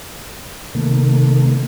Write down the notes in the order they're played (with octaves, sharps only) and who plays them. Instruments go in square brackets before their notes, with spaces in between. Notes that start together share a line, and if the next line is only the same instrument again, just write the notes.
[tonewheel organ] C3 D#3 A3 A#3